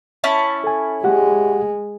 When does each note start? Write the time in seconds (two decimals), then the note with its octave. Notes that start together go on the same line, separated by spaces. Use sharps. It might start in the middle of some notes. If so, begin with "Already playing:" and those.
0.24 C#4 E4 A5
0.64 A4 G#5
1.04 G#3 G4 F#5